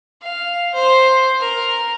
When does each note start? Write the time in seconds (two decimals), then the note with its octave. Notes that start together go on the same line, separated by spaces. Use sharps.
0.22 F5
0.74 C5
1.40 A#4